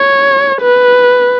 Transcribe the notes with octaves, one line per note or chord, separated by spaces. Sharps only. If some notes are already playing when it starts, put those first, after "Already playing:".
Already playing: C#5
B4